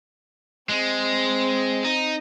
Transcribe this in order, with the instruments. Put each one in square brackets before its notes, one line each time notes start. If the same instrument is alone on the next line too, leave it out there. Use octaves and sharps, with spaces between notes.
[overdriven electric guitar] G#3 [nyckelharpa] C4
[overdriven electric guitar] D#4